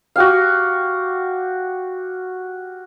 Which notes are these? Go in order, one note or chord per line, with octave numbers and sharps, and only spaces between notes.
F#4 G4 F5